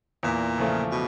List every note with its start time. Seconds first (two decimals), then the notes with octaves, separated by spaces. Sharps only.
0.23 E2 A#2
0.58 C#3 F3 A3
0.91 B2